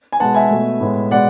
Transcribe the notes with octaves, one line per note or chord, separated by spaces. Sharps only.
G#5
B2 G#3 B3 F#5 A5
E5 G#5
B2 A3
A2 G#3 B3
B2 G#3 B3 D5 F#5